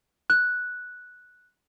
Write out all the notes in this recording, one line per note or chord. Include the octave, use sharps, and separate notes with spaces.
F#6